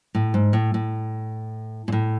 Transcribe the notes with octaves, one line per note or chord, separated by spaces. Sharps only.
A2
G#2
A2
A2
A#2
A2